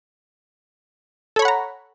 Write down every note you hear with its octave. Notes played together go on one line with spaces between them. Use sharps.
A4 C#5 F#5 A#5 B5